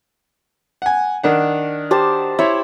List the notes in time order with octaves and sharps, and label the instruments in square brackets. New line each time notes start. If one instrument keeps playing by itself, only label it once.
[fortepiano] F#5 G#5
D#3 D4 F#5
[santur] G4 C5 A5
[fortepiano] E4 C#5 [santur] C5 E5